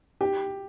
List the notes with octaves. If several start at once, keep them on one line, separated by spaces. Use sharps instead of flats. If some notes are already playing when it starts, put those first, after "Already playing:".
G4